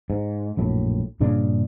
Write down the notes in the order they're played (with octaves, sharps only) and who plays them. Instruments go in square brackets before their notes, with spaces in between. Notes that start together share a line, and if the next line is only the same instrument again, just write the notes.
[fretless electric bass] G#2
A#1 F#2 A2
G2 A#2 C#3 D4